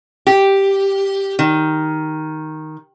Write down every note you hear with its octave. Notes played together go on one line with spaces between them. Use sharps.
G4
D#3